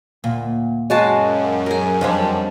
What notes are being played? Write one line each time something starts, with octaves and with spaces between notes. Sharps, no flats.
D2 A#2
F#2 G#3 F#4 C#5 F5 G#5 A5
G#4 A#4
F2 G3 D4 B4 C5 D#5